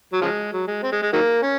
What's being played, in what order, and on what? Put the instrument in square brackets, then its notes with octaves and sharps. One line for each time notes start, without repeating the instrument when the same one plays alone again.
[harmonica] F#3
C#3 F3 G#3
F#3
G#3
C4
G#3
G#3
D#3 F#3 A#3
C#4